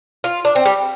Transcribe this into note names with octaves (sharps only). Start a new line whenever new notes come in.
F4
D4
C4
G3